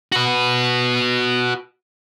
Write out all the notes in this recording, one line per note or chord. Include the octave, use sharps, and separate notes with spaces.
F#4 B4